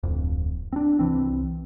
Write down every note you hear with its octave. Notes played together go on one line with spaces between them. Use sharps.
D1 F2
C4 D4
C2 E3 C4